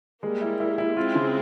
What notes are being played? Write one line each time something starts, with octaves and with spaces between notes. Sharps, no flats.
G3 G#3 A#3
E4
E4
E4
G#3 C4 F4
C#3